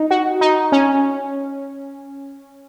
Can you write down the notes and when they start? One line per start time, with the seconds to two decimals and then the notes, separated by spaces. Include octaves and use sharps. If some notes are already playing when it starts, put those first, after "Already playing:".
Already playing: D#4
0.11 F#4
0.41 D#4
0.72 C#4